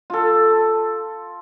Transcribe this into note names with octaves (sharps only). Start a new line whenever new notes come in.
F4 A4